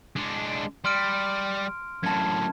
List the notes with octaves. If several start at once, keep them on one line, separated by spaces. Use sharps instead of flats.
G#3 D4
G3 C6 F6 D7
F#2 A2 A5 G#6